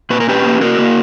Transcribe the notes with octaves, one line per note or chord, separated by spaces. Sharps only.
A#2 B4
A#4
C#4 G4 B4
A#3
A#3 F#4 A#4
A#3